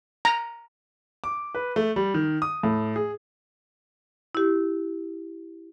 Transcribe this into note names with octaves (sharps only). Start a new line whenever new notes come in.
A#5
D6
B4
A3
G3
D#3
D#6
A2
G#4
E4 G4